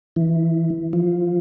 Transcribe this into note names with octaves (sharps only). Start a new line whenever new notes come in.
E3
F3